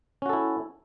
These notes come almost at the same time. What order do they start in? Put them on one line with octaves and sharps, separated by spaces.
C#4 F#4 A4 E4